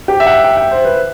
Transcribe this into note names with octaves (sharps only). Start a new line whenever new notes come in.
G4
E5
F#5
G5
G5
C5
B4